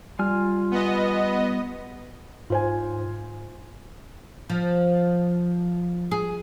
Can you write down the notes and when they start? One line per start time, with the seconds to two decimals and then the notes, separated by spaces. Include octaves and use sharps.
0.19 G3 F4 G#5 F6
0.71 B3 D#5
2.50 G#2 F4 C5 G#5
4.50 F3
6.11 G#4